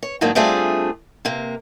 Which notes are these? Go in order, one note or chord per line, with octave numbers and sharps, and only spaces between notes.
C#5
G#2 D#3 F#3 A#3 D4
G3 A3 C4 D4 F4 G#4
C3 A#3